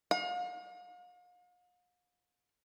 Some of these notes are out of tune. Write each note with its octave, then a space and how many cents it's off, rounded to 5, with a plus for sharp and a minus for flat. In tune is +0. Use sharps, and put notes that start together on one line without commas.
F5 +40